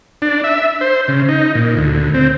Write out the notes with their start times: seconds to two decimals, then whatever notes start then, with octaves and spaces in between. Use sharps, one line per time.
0.22 D4
0.44 E5
0.81 C5
1.08 C#3
1.29 D#4
1.55 A#2
1.77 D2
2.14 C4